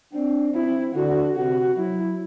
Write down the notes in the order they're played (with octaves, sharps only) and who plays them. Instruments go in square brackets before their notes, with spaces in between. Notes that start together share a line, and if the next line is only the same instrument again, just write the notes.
[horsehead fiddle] C4 [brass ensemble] D4
[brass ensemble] C4 [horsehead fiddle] E4
[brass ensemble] D3 [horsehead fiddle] F#4
[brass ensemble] C3 [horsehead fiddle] F#4
[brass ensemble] F#3 [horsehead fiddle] E4